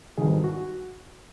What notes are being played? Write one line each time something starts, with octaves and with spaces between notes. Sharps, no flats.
G#1 G2 D#3 G#4
F#4